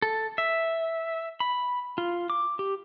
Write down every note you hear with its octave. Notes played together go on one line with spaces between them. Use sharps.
A4
E5
B5
F4
D6
G4